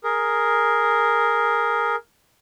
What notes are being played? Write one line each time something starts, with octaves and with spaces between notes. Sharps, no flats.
G#4 A#4